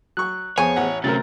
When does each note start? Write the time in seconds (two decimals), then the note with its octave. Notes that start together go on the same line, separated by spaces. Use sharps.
0.17 F#3 C#6 F#6
0.58 F2 B3 G#4 C5 C#5 G#5 C#6
0.76 A1 F#5
1.04 C3 F#3 A3 C4 C#4 A#4 A6